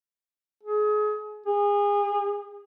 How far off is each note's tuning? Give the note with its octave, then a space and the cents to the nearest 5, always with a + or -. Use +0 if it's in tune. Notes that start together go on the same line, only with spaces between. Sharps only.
G#4 +30
G#4 -30